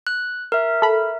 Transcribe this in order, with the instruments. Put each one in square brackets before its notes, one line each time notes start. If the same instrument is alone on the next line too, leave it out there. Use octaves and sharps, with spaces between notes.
[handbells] F#6
A#4 E5
[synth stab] A4 B5